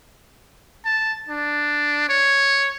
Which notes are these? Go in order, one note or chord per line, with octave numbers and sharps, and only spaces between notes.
A5
D4
C#5